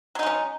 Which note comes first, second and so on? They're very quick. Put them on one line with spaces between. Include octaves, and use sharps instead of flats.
F#3 D#4 G#3 C#4